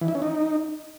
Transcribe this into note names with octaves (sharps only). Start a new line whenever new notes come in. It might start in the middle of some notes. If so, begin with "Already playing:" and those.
E3
E4
C#4
D#4